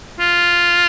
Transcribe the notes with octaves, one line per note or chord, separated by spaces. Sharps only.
F4